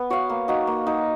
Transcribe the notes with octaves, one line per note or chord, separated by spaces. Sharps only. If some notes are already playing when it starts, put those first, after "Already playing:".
Already playing: B3
F#4 C#5 F5
A#3
D#4 F#4
A#3
D#4 F#4